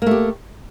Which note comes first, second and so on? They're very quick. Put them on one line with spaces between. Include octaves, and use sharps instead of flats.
A#3 A3 G4